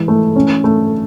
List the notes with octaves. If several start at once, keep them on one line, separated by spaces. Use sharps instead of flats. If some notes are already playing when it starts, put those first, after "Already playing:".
Already playing: E3 G#3
A3
C#4
A3